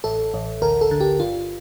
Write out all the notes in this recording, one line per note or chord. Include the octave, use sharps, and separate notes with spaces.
A1 A4
A1
D2 A#4
A4
D3
G4
G1 F4